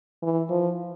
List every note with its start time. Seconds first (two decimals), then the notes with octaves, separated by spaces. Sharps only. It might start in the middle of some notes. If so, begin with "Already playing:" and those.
0.23 E3
0.50 F3